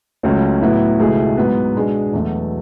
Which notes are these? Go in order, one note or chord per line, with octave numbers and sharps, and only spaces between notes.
C#2 C#3 F#3 A3 C#4
A2 F#3 B3 E4
C#2 B2 A3 E4 G#4
G#2 F#3 B3
B2 G#3 D4 G#4
E2 B2 F#3 A3